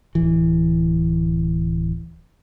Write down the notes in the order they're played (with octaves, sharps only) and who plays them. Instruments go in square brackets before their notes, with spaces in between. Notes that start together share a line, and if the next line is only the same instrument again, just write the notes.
[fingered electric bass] D1 E3